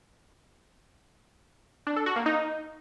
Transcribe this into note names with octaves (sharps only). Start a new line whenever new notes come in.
D4
A4
F#4
A#3
D#4